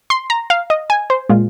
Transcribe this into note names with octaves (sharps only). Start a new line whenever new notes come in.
C6
A#5
F5
D#5
G#5
C5
A#2 G#3 F4